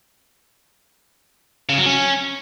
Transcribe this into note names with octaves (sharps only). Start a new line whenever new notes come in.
C#3
F#3
C#4